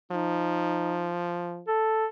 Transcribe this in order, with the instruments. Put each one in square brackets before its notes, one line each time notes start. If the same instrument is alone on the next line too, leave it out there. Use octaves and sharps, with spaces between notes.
[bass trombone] F3 [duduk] D#4
[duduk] A4